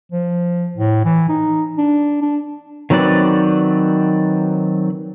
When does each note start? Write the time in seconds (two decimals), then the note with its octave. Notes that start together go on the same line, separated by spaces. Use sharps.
0.12 F3
0.77 A2
1.05 E3
1.29 D#4
1.78 D4
2.22 D4
2.90 D#3 F#3 C4 B4 D5